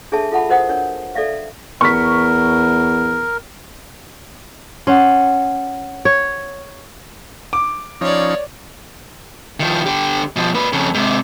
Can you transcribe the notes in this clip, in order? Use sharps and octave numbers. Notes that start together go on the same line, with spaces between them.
D4 G#4 A4 C#5 E5 A5
F4 A4 E5 F#5 A5 B5
F#4 A#4 C5 D#5 F#5 D#6
D4 A#4 C#5
A4 D5 E5 F5
E2 A#4 C#6 B6
C#4 F#5 C6
C#5
D6
F3 C#4 D#4 C#5 D5
D#3 F3
D3 G4
B2 F3
A#2 B4
F2 C#3
G#2 C3